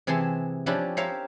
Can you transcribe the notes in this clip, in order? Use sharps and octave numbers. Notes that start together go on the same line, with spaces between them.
C3 E3 G#4 A5 C6
F3 C#4 D4 E4 G4 B4
G4 A#4 C5 C#5 E5 F5